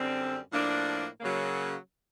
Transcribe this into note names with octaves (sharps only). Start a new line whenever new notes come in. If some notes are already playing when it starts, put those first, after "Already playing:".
Already playing: F#2 D3 G3 C4
A2 F3 A#3 D4
C#3 F#3 A#3